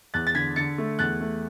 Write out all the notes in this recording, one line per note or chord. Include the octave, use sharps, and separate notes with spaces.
E2 F#6 A6
A6
D3 G#6 B6
D3 A6 C#7
A3
E2 F#6 A6
A3